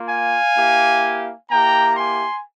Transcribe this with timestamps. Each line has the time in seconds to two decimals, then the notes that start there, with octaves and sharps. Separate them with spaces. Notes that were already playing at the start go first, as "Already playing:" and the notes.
Already playing: A#3 F4
0.08 F5 G#5
0.56 A#3 E4 G4
1.50 A#3 E4 G4 G5 A#5
1.97 G#5 C6